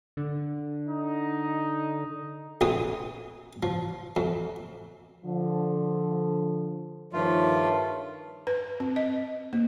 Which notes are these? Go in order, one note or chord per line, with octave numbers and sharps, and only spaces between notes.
D3
D#4
A#1 F2 C4 D#6
F3
F2
D3 F3
G2 D#3 F3 A3 F4 C#5
B4
C4
D#5
A#3